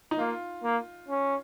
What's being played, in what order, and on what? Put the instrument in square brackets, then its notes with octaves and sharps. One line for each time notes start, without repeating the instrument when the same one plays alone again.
[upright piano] D#4
[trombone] A#3 [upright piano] F4
[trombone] A#3
C#4